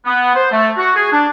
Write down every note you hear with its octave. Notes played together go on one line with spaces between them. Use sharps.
B3
C5
A3
F#4
G#4
D4